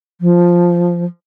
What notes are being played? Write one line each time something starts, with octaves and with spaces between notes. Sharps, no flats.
F3